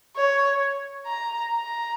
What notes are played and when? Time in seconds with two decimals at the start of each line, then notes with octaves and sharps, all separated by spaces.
0.17 C#5
1.06 A#5
1.51 A#5